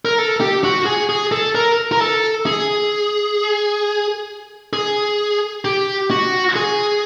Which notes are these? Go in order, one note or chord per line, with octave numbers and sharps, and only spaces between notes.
A#4
A4
G4
F#4
G#4
G#4
A4
A#4
A#4
A4
G#4
G#4
G4
F#4
G#4